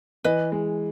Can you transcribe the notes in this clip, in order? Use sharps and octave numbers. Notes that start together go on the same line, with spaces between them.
E3 B4 D#5
G#3